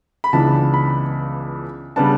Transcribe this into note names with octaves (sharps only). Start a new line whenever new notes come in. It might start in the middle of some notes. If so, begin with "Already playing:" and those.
B5
C#2 C#3 E3 B3 D4 A5
B5
C#3 G3 B3 D4 A5